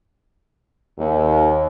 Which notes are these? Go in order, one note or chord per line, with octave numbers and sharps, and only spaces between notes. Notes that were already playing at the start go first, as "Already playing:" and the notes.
D#2